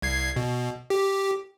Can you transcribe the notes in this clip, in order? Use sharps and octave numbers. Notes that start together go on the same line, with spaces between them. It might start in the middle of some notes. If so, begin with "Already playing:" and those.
C2 G#6 C7
B2
G4